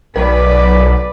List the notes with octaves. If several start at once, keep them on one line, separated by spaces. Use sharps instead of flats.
B1 A#4 B4 D5